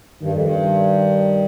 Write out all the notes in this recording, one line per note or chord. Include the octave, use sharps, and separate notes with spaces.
G2 D#3
F2
G2